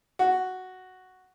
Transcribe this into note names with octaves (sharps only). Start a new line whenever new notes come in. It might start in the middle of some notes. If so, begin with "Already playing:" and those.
F#4